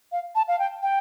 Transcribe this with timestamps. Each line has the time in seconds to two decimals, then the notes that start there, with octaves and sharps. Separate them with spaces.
0.12 F5
0.35 A5
0.48 F5
0.59 G5
0.83 G5